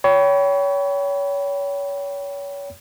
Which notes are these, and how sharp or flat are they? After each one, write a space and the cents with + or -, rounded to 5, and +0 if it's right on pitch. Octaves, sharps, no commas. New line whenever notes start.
C#5 +30 G5 -15 B5 +0